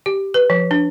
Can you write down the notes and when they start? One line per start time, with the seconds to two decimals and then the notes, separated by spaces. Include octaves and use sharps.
0.06 G4
0.34 B4
0.50 F3
0.71 D4